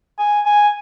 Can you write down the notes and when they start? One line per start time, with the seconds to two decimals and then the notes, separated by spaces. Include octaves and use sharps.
0.19 G#5
0.46 G#5